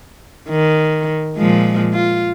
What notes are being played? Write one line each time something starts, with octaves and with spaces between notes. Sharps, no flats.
D#3
A#2 F3 G#3
F4